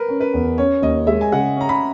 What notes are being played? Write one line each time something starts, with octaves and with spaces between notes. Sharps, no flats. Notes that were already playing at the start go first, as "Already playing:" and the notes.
Already playing: A#4 B4
C#4
B4
E2
C#4 C#5
D#2 D#5
G#3 E5
G#5
C#3 F#5
C#4 A#5
B5